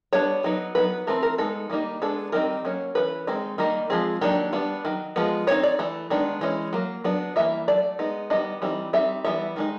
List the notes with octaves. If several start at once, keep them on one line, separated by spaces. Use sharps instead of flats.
G3 B3 D4 C#5
F#3 B3 D#4
F#3 B3 D#4 B4
E3 A3 C4 A#4
A#4
G#3 B3 D#4 A4
D#3 G3 A#3 D#4
G#3 B3 D4 A4
D#3 G3 C4 D#4 A#4
F#3 A#3 C#4
E3 A3 C#4 B4
D#3 G#3 C4 D#4
D#3 G3 A#3 D#4
F3 G#3 C4 G#4
D#3 F#3 A#3 D4 G4
G3 B3 D4
D#3 F#3
F3 G#3 B3
G3 C4 D#4 C#5
D5
E3 A3
D#3 G#3 B3 D4
E3 G#3 C#4
F#3 A#3
F#3 B3 D4
E3 G3 A#3 E5
F#3 A3 D5
G#3 B3 D#4
D#3 G3 B3 D4 D#5
E3 G3 C4 D#4
G3 C4 D#4 E5
E3 G3 B3 E5
D#3 G#3 D#4